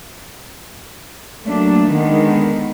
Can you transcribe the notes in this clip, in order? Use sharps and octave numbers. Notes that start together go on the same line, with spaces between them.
F#3 A3 A#3 D4
D3 D#3 G#3 B3